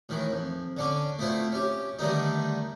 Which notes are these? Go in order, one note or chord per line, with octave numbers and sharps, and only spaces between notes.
A2 D#3 E3
F2
D3 C#4 D4
A3 B3 C4 E4 F4
C#4 G4
D3 D#3 G3 A3 B3 D#4